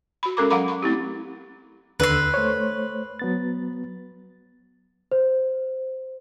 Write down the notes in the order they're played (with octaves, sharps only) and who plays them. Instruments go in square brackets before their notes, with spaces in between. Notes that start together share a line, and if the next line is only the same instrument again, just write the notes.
[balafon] F#4 B5
G#3 C#4 A4 A#4 A#5 D6
F#3 F5 F#5 A#5 B5 D6
B5 C#6
A3 C4 E4 G4
[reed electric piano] D#2 D3 E6 [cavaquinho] B4 C6
[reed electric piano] A3 C5 C#5
F#3 B3 A6
[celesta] C5